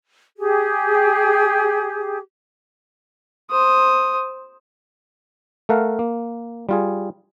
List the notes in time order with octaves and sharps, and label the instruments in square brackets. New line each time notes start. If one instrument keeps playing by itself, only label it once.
[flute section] G4 G#4
[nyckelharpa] C5 D#6
[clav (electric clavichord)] A3 A4 A#4 F5 F#5
A#3
G3 F4 G#4